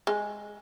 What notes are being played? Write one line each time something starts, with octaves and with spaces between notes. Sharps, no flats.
G#3